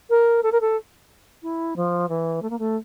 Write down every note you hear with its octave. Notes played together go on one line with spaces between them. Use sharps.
A#4
A4
A#4
A4
E4
F3
E3
A3
A#3
A3